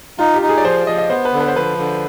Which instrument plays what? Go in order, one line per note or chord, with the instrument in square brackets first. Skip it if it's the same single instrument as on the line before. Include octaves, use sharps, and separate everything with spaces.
[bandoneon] D#4 [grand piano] F4
[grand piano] G4
[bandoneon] D#4
[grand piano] G#4
D5
[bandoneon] F3 [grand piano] C5
[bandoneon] F3 [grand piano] D#5
[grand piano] D#5
[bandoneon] B3 [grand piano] C5
[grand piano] B4
[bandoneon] D3
[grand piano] B4
C5
[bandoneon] F3 [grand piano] B4
[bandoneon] D3